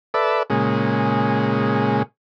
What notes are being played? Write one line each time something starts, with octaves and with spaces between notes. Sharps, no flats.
A4 B4 D5 E5
A#2 C#3 G#3